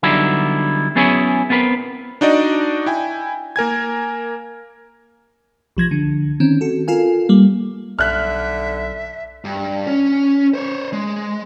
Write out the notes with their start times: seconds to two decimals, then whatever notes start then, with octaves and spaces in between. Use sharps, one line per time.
0.03 D3 F#3 G3 B3 D#4 E4
0.95 F#3 B3 C#4 E4 G#4 C#5
1.50 B3 C4 A#4 B4
2.21 D4 D#4 F#4 D5 D#5
2.86 E4 G5 G#5
3.56 A#3 A#4 G#5 G#6
5.77 C2 F3 G#6 A#6
5.91 D3
6.40 D#3 C4 C#4
6.61 F#4 A4
6.88 F4 A4 A#4 F5 G#5
7.29 G3 A#3
7.99 B1 D3 E5 F6 F#6
9.45 G2
9.87 C#4
10.54 C5 C#5
10.93 G#3